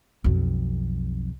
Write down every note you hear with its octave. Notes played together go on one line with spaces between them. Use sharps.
B1 F2